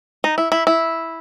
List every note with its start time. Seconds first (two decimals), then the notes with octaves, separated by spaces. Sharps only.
0.24 D#4
0.38 E4
0.52 E4
0.67 E4